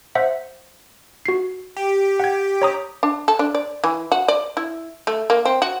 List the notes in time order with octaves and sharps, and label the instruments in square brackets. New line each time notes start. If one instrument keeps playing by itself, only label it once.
[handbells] C5 E5 F#5
F#4 C7
[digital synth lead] G4
[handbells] F#5 G#6
C#5 A#5 D#6
[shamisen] D4
A4
D4
D5
E3
F#4
D5
E4
A3
A#3
C4
F#4